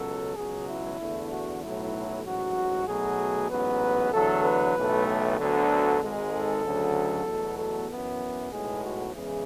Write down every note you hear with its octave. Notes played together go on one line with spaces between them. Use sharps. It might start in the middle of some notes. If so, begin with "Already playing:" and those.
Already playing: C#2 B2 F#3 A4
C#2 B2 F#3 G#4
E4
E2 D3 A3
F#4
B1 A2 F#3 A3 E4
A1 G#2 F#3 F#4
B1 B2 F#3 A3 G#4
A1 G#2 F#3 B3 B4
E2 D3 F#3 A3 A4
B4
B1 A2 E3 A3
A4
D2 D3 F#3 B3 A4
G#1 G#2 G#3
A4
D2 C#3 F#3
E2 B2 F#3 A3
A4
F#2 E3 B3
B1 A2 G#3 B3 G#4
F#4
E2 C#3 E3 G#3 G#4